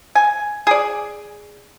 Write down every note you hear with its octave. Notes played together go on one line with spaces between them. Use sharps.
G#5
G#4 D5